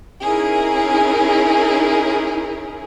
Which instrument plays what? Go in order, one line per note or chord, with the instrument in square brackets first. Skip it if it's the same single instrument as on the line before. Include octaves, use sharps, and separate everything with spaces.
[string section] C#4 D#4 E4 G#4 A#4